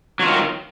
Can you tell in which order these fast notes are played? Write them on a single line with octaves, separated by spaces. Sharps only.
F#3 F4 D#3